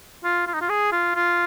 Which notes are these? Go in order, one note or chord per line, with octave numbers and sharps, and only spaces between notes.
F4
F4
D#4
F4
G#4
F4
F4